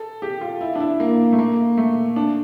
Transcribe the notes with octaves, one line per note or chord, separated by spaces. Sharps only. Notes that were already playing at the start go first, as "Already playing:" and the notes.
Already playing: A4
G4
F4
E4
D4
E4
A#3
A3
A#3
A3
D4